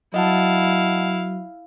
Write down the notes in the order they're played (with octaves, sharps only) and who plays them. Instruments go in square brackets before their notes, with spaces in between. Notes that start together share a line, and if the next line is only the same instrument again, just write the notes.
[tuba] F#3 [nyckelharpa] E4 F5 [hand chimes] D#5 F#5 A5